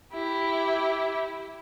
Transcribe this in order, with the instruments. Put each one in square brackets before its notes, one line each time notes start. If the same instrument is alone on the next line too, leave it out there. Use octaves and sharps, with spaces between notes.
[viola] E4 G4